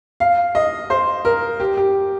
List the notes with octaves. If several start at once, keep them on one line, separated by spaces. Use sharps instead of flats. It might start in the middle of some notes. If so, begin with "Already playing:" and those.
F5
D#5
C5
A#4
G4
G4